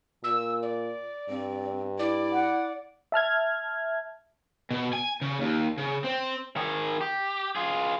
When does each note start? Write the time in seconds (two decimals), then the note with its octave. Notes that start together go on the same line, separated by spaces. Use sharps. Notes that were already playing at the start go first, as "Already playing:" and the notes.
0.23 A#2 E6
0.62 D5
1.29 G2 C4
1.99 E4 D5
2.32 F#5
3.12 E5 A5 F6 G#6
4.71 B2
4.93 G#5
5.22 C#3
5.41 D#2
5.78 C#3
6.04 C4
6.56 D#3 G#4
7.01 G4
7.55 F4 G#4